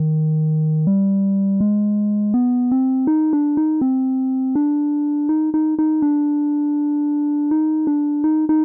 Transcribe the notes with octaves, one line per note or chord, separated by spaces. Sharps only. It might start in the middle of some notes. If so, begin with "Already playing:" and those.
Already playing: D#3
G3
G#3
B3
C4
D#4
D4
D#4
C4
D4
D#4
D#4
D#4
D4
D#4
D4
D#4
D#4